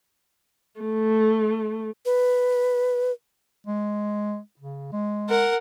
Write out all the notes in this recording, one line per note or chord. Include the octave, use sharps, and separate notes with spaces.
A3
B4
G#3
C#3
G#3
A#4 F#5